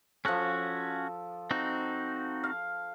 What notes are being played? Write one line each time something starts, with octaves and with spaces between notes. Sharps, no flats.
F3 C#4 F#4 A4 F#6
C4 D#4 F#4
F5